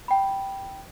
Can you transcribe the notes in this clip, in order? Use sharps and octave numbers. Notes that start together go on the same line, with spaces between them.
G5 B5